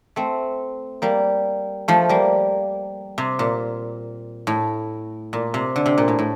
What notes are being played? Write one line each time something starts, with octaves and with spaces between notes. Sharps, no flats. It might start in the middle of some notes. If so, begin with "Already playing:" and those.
A3 C4
G3 A#3
F3 A3
G3 A#3
C3
A#2
A2
A#2
C3
D3
C3
A#2
A2
A2